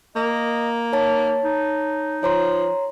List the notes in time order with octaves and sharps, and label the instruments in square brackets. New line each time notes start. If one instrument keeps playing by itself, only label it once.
[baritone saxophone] A#3 [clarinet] D#5
[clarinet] D#4 [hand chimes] C#5 A5 A6
[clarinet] D#4
[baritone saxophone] F3 [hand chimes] C#5 A#5 C6